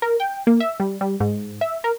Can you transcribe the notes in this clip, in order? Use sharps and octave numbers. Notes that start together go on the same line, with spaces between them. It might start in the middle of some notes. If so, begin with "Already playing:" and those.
A#4
G5
A#3
E5
G3
G3
G#2
E5
A#4